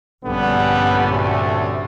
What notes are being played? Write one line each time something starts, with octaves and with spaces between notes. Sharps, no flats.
A#1 G2 D3 G3 B3 C#4
D2 C3 A3